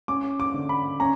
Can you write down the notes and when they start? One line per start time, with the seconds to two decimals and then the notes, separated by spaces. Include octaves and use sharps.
0.08 C#4 D6
0.40 D6
0.54 D3
0.69 B5
1.00 C#4 A#5